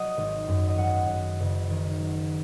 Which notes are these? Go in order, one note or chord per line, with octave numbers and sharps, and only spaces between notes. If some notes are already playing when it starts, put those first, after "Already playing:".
Already playing: F#3 C#5 D#5 F#5
G#1
F#2
D#5
F#3 F#5
F#2
F#1
D#3
F#3